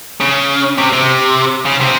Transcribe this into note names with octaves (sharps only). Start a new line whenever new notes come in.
C#3
C3
C3
C#3
C3